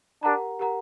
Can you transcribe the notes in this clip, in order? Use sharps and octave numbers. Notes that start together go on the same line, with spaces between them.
D4 G4 A#4 F#5 A#5
G4 A#4 F#5 A#5